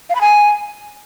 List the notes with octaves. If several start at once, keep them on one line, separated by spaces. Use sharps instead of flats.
F5
B5
G#5